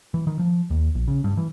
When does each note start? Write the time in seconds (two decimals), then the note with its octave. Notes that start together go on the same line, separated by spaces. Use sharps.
0.14 E3
0.27 D#3
0.39 F3
0.70 D#2
0.95 A#1
1.08 C#3
1.24 G2
1.37 E3